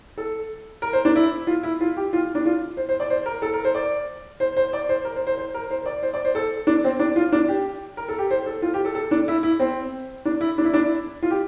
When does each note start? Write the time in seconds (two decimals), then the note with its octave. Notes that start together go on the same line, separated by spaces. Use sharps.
0.17 A4
0.82 A#4
0.93 C5
1.05 D4
1.16 E4
1.47 F4
1.63 E4
1.81 F4
1.97 G4
2.13 F4
2.35 D4
2.46 F4
2.77 C5
2.89 C5
3.00 D5
3.10 C5
3.26 A#4
3.42 A4
3.53 A#4
3.65 C5
3.74 D5
4.40 C5
4.57 C5
4.73 D5
4.89 C5
5.05 A#4
5.16 C5
5.27 C5
5.38 C5
5.54 A#4
5.70 C5
5.86 D5
6.03 C5
6.14 D5
6.25 C5
6.35 A4
6.67 D4
6.84 C4
6.99 D4
7.16 F4
7.32 D4
7.48 G4
7.97 A#4
8.09 A4
8.19 G4
8.31 C5
8.46 A4
8.62 F4
8.74 G4
8.85 A4
8.95 A4
9.11 D4
9.28 E4
9.43 E4
9.60 C4
10.25 D4
10.41 E4
10.58 D4
10.65 E4
10.74 D4
10.82 E4
11.22 F4
11.31 G4